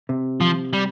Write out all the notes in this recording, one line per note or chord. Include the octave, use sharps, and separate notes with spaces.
C3
F3
G3